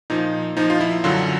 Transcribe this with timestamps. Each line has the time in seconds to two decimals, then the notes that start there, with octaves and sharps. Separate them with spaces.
0.10 A#2 F3 D#4
0.57 A#2 F3 D#4
0.70 F4
0.81 E4
1.04 F#2 D3 F#3 F4